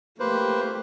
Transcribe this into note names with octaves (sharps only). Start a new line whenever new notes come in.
A3 A#3 G4 B4 C5